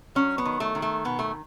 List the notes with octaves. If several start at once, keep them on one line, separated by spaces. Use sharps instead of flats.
F#3 C#4
B3
D#3
A3
D#3
A3
B2 B3
A3